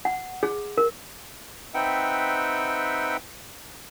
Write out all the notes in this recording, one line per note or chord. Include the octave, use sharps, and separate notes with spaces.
F#5
G#4
A#4
C4 D#4 B4 E5 F#5 G5